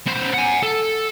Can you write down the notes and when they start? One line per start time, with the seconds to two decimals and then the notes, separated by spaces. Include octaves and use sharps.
0.07 B3 C5
0.34 F#5 G#5
0.63 A4